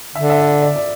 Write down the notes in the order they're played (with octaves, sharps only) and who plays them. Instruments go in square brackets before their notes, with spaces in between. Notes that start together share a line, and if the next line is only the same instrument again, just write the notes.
[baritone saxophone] D3 [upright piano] E5
[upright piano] E5
D5
D5
D5